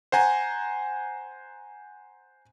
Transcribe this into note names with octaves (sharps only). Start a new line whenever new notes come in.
C5 F#5 G#5 A#5